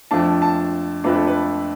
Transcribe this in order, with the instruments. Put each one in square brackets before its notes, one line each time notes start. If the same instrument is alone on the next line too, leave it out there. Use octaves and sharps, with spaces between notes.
[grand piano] F2 F3 A3 D4 A5
A5
F2 F3 A3 D4 B4
A4
B4